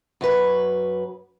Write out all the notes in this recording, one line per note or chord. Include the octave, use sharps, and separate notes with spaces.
F#2 F#3 B4 C#5